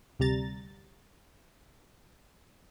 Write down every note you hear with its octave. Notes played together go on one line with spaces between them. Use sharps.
D2 C3 G3 A#5 A6